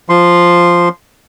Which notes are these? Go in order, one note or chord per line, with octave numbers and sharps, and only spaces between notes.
F3 C6